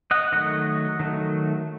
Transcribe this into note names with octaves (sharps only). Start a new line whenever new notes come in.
D#5 F#5
D#3 F#3 A3 D#5 F#5
D#3 F#3 A3